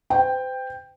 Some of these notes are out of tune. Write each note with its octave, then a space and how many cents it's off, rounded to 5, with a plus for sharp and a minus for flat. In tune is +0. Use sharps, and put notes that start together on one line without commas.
C5 -40 G5 +10